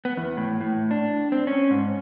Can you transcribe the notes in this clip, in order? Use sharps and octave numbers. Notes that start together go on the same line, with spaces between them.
B3
E2
A2
A2
D4
C4
C#4
G#2